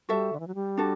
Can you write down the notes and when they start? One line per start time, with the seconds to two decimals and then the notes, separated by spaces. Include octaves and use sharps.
0.09 G3 F#4 A4 E5
0.33 D3
0.40 E3
0.47 F#3
0.55 G3
0.77 D4 F#4 A4